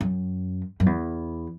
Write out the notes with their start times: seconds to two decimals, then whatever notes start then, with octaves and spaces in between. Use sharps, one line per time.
0.01 F#2
0.80 F#2
0.86 E2